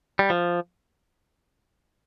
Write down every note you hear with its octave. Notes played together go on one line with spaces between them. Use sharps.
G3
F3